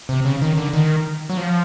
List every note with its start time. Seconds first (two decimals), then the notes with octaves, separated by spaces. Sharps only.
0.09 C3
0.25 C#3
0.42 D#3
0.57 D3
0.73 D#3
1.30 F#3
1.37 F3